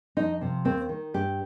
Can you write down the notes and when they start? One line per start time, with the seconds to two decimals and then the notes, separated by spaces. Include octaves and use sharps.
0.17 F2 D#4
0.41 C3 F3
0.65 D#2 C4
0.89 D#3
1.14 G2 G4